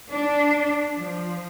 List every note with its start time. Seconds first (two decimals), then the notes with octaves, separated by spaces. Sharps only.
0.11 D4
0.96 F3